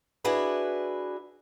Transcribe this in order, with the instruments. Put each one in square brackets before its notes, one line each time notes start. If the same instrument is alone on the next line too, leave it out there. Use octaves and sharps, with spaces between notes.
[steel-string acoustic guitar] D4 E4 F#4 G#4 B4